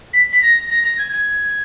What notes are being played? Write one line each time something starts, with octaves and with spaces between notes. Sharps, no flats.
B6
B6
A#6
A#6
A#6
G#6
G#6